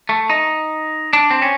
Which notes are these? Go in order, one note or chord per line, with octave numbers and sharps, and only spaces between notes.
A3
D#4
D4
C4
C#4